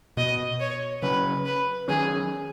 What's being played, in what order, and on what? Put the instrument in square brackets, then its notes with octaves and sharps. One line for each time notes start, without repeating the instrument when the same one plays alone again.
[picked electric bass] B2 B3 [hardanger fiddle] D#5
[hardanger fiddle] C#5
[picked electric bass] C#3 F#3 C#4 [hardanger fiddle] B4
[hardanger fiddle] B4
[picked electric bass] D#3 F#3 C#4 [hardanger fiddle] G#4